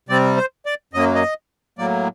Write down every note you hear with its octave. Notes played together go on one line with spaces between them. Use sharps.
C3 G3 C4 D5
C5
D5
F#2 F#3 A#3 D#5
D#5
A2 F#3 A#3 D5